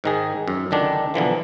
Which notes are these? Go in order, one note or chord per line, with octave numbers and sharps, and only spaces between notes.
G#2 D#3 G#4
F#2
C#2 D3 D#3 D4
B1 D3 E3 F3